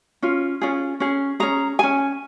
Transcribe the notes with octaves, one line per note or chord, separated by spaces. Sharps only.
C#4 F4
C#4 F4 G#4
C#4 G#4
C#4 G#4 A#5
C#4 G#4 G#5